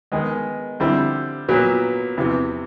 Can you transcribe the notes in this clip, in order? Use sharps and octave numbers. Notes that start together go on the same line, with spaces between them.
D#3 G#3 B3 D#4 G#4
D3 G3 C4 E4
A#2 F#3 B3
E2 C3 E3